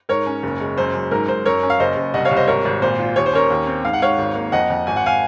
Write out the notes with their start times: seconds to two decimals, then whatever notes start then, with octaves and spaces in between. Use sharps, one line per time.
0.09 G#2 A#4 C#5
0.27 C#4
0.43 F#1
0.60 G#3
0.78 F#2 C5
0.94 F#2
1.11 G#2 A#4
1.28 G#2 C5
1.46 F#2 A#4 C#5
1.63 C#4
1.70 F5
1.79 F#1 C5 D#5
1.97 F#1
2.14 C2 D#5 F#5
2.25 C#5 F5
2.31 C2
2.37 C5 D#5
2.47 G#1 A#4 C#5
2.65 G#1
2.82 A#2 C5
2.99 F4
3.16 D#2 C#5
3.26 C5
3.33 C#4 A#4 C#5
3.50 D#2
3.67 C4
3.84 G#2 F5
3.93 F#5
4.02 G#2 C#5 F5
4.18 G#1
4.35 A#3
4.52 F2 D#5 F#5
4.70 F2
4.87 G#1 G#5
4.96 F#5
5.06 F5 G#5